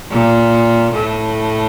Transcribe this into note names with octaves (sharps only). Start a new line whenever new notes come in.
A#2
A2